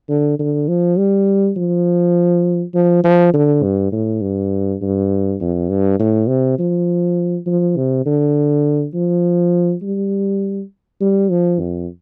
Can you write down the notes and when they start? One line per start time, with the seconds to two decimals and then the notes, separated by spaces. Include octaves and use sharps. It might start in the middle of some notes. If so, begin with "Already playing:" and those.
0.09 D3
0.39 D3
0.68 F3
0.98 G3
1.57 F3
2.75 F3
3.04 F3
3.34 D3
3.63 G2
3.92 A2
4.22 G2
4.82 G2
5.41 F2
5.70 G2
6.00 A2
6.28 C3
6.59 F3
7.47 F3
7.77 C3
8.06 D3
8.94 F3
9.83 G3
11.01 G3
11.31 F3
11.60 F2